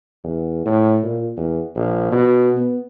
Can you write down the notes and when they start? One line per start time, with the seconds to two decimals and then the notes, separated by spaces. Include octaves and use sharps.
0.24 E2
0.66 A2
1.04 A#2
1.37 E2
1.76 A#1
2.11 B2
2.57 B3